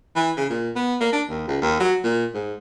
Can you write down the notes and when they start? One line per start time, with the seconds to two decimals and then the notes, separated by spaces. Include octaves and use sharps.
0.16 E3
0.37 C#3
0.50 A#2
0.76 B3
1.01 A#3
1.13 D4
1.29 D#2
1.47 C#2
1.62 D#2
1.80 F#3
2.04 A#2
2.34 G#2